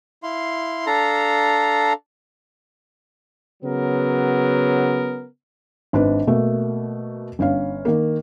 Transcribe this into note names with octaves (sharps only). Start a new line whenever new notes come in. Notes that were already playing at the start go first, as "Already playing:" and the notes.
E4 F5 C6
D4 A4 F5 A#5
C#3 F#3 B3 A#4
G#1 D4 B4
B2 A3 A#3
G1 C#4 F5
D#3 A#3